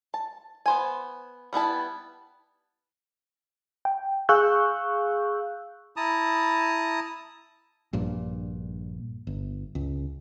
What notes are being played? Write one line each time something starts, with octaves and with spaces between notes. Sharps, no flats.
A5
B3 C5 G#5
G3 B3 E4 A5
G5
G#4 F5 C#6 E6 F#6 G6
E4 A5 A#5 D#6
A#1 G2 A#2
G1
C#2